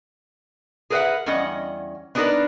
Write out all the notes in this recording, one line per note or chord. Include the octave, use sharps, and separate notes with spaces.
G#4 A#4 B4 C#5 E5 F#5
E2 G3 C#4 D#5 F#5
B3 D4 D#4 G#4 A#4 B4